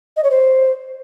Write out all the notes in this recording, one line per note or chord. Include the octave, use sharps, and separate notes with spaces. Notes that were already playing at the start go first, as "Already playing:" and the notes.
D#5
C#5
C5